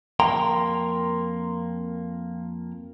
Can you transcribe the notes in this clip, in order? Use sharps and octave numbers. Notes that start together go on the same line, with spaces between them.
F2 A#3 G5 A#5 C6